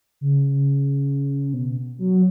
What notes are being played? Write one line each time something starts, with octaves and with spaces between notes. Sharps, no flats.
C#3
B2
F#3